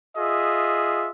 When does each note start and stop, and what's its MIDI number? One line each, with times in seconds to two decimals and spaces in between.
0.16 1.11 65
0.16 1.11 68
0.16 1.11 75
0.16 1.11 76